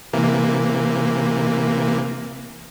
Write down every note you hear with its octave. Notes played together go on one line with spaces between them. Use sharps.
C3 E3 A#3